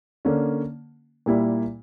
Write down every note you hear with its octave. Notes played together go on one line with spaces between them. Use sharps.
D3 A#3 C#4
A#2 G3 A#3 E4